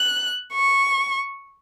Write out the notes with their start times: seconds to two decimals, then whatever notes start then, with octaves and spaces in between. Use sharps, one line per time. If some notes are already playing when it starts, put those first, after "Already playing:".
Already playing: F#6
0.54 C#6